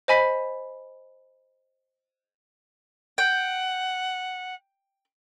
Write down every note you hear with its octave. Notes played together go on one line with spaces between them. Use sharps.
C5 D#5 G#5 B5 B6
F#5 G5